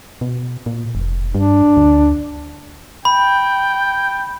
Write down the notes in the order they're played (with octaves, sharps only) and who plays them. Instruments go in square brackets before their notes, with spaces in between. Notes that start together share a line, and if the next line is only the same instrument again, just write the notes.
[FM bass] B2
A#2
F1
[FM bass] G2 [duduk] D4
[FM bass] D2
[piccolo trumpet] G5 [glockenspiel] B5